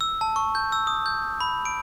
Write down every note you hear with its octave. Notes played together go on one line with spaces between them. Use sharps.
E6
A5
C#6
G6
E6
D#6
G6
B5
D7